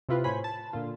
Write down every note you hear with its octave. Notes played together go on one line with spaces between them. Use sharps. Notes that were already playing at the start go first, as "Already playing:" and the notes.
C3 E4 F4 B4
A2 C5 C#5 G#5 B5
A5
A#2 D3 F4